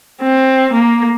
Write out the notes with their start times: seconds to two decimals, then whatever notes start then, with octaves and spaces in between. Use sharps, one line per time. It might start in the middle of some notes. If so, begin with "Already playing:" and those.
0.22 C4
0.73 A#3